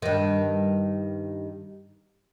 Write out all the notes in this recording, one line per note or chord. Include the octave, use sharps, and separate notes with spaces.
G2 D#3